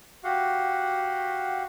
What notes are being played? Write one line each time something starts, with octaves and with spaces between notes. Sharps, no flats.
F#4 G4 F5 F#5